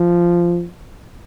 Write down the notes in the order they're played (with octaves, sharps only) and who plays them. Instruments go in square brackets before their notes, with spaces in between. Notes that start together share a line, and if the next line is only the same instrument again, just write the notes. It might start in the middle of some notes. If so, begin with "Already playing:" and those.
Already playing: [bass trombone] F3